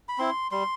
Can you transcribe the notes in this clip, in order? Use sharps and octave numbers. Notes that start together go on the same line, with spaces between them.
B5
C4 E4 C6
G3 C6